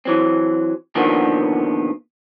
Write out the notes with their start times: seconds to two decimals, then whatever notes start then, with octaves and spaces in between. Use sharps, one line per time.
0.05 E3 F#3 C4
0.95 B2 D3 D#3 F3 A#3 B3